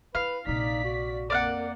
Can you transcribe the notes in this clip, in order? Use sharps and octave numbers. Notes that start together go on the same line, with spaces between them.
E4 B4 F5
A#1 C3 D#4 D5 B6
F#4
F2 A#3 D5 F5 F#5